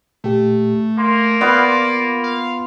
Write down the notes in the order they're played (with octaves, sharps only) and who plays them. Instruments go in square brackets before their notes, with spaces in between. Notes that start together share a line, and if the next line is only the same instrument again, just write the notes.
[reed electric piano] A#2 G4 [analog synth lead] A3
[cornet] A#3 [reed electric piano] C6
[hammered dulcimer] B3 F4 [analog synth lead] D5
[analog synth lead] F5